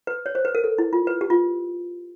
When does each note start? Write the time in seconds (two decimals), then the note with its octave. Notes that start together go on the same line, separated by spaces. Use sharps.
0.07 B4
0.26 C#5
0.35 C5
0.45 B4
0.55 A#4
0.64 A4
0.78 E4
0.93 F4
1.07 B4
1.21 G4
1.30 F4